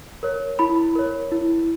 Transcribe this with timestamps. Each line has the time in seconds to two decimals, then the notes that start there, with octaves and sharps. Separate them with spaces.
0.23 A#4 C#5
0.59 E4 B5
0.95 A#4 C#5
1.31 E4